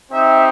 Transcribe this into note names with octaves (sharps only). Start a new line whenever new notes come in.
C4 D#4 G4 E5